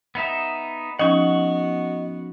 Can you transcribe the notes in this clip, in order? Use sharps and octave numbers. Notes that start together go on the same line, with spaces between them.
B3 D#4 E5
F3 B3 C#4 D#4 F#4 D#5 F#5 C#6